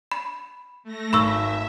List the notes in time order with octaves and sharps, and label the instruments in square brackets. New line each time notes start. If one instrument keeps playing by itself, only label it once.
[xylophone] B5
[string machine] A3 A#6
[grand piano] G#1 [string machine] E5 [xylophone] B5 C#6 E6